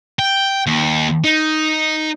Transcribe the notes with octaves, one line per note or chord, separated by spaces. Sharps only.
G5
D#2
D#4